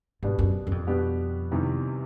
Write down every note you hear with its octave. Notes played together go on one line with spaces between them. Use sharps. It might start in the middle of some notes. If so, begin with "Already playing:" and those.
G#2 B2 G3 B3 D4 G4
F#2
F#2
F2
B2 G3 B3 D4 G4
E2 C3 D#3 G3